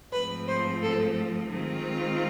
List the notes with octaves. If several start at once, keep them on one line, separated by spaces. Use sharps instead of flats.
G#2 F3 A3 C4 B4
C5
A4
D#3 G#3 C4 F4